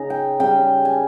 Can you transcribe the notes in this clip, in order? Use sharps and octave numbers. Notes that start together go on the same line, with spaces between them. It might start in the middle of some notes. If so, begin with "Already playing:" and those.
Already playing: C#3 D#4 A#5
G5
C#3 G3 C#4 G5
G#5